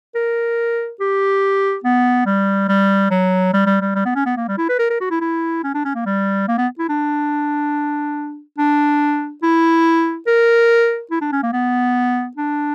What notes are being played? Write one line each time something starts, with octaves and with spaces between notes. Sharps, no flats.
A#4
G4
B3
G3
G3
F#3
G3
G3
G3
G3
B3
C#4
B3
A#3
G3
E4
B4
A#4
A#4
F#4
E4
E4
C#4
D4
C#4
A#3
G3
A#3
B3
E4
D4
D4
E4
A#4
E4
D4
C#4
A#3
B3
D4